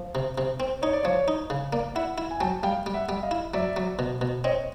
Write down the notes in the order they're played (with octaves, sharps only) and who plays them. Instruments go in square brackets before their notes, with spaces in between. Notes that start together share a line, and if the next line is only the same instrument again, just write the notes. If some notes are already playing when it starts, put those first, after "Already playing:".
Already playing: [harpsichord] F3
C3
C3
C4
[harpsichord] D#4 [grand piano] C#5
[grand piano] D5
[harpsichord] F3 [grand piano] C#5
[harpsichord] D#4
C#3
[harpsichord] A#3 [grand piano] D5
[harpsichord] E4 [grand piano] E5 F#5
[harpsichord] E4
[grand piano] G#5
[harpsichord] F#3 [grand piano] G5 A5
[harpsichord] G3 [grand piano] F5 G5
[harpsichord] G3
[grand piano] E5 F#5
[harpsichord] G3
[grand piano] D#5 F5
[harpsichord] E4
[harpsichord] F#3 [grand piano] D5 E5
[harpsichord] F#3
B2
B2
[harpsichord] C4 [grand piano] C#5 D#5